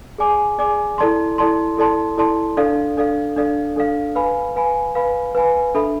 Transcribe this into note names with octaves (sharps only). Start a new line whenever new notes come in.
G#4 D5 G#5 D6
G#4 D5 G#5 D6
E4 A4 D5 A5 C6
E4 A4 D5 A5 C6
E4 A4 D5 A5 C6
E4 A4 D5 A5 C6
D4 A4 D5 F5
D4 A4 D5 F5
D4 A4 D5 F5
D4 A4 D5 F5
B4 F5 G#5 B5
B4 F5 G#5 B5
B4 F5 G#5 B5
B4 F5 G#5 B5
D4 A4 E5 B5